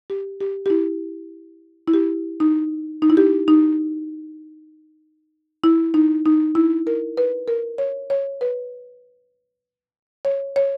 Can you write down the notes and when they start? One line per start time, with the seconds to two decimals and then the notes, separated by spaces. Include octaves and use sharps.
0.10 G4
0.40 G4
0.66 G4
0.70 E4
1.88 E4
1.94 G4
2.40 D#4
3.02 D#4
3.10 E4
3.17 G4
3.48 D#4
5.64 E4
5.94 D#4
6.26 D#4
6.55 E4
6.87 A#4
7.17 B4
7.48 A#4
7.78 C#5
8.10 C#5
8.41 B4
10.25 C#5
10.56 C#5